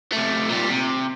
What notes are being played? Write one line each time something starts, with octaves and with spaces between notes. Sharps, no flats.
C3 A3
A#2 G3
C3